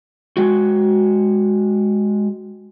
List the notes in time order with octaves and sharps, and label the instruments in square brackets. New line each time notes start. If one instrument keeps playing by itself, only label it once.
[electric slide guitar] G#3 F#4